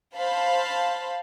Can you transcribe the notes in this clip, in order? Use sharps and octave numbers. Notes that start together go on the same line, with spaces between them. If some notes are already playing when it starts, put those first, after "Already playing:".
C5 F5 A5 B5